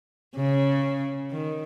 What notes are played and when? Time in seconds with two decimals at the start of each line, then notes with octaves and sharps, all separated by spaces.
0.36 C#3
1.31 D#3